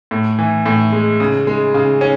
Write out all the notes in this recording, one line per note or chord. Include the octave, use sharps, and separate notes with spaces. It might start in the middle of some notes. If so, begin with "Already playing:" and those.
A2
E3
A2
G#3
C#3
G#3
C#3
C#4